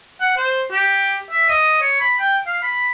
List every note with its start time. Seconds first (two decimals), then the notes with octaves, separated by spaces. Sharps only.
0.21 F#5
0.38 C5
0.71 G4
1.31 E5
1.49 D#5
1.82 C#5
2.01 B5
2.20 G5
2.47 F5
2.63 B5